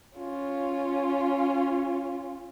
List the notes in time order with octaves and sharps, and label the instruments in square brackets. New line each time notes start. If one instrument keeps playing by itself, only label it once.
[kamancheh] C#4 F4